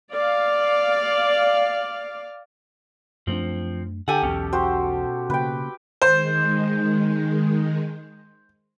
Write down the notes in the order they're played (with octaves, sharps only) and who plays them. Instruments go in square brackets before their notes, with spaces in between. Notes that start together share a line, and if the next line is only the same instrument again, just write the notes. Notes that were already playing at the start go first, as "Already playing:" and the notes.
[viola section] D5 F5
[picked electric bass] F#2 A3 D4 [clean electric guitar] F3 C4
[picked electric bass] D3 [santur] G4 A4 [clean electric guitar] F#5 G#5
[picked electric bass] B1 E2 [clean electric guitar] B2 C#4
[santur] F#4 G4 C5
[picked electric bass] C#3 A#3 [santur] B4 G5
[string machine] D#3 G#3 [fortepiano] C5